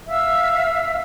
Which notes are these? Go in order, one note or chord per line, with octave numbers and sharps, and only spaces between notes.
E5 F5 E6